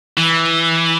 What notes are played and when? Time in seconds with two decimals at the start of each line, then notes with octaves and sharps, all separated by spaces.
0.17 E3